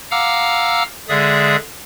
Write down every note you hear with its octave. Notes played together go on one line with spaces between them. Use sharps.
F5 F#5 A#5 D6 E6 F6
D3 G#3 G#4 D5 E5 D#6